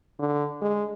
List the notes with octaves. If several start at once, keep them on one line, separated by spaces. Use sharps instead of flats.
D3
G#3